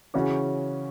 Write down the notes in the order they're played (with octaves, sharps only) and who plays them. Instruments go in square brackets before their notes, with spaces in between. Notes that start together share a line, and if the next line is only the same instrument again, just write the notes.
[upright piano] C#3 E3 C#4 F#4